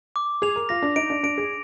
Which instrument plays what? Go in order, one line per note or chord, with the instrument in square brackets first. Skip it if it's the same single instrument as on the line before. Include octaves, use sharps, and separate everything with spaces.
[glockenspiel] D6
[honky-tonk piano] G#4 [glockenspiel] F7
[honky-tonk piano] A#4
[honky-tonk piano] F4 [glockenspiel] A#6
[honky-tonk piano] D4
[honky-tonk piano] D#4 [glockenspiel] D7
[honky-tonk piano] D4
[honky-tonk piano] D4 [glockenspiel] D7
[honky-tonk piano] G#4